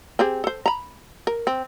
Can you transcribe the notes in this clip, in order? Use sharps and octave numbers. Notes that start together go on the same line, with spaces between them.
C4 G4 G#4
A4 C5
A#5 B5
A#4
C4